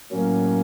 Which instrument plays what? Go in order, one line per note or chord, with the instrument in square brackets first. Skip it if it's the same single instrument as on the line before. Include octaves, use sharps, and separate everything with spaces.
[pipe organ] A2 F#3 A#3 C#4